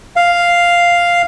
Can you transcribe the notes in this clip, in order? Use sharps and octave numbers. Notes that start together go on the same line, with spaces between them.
F5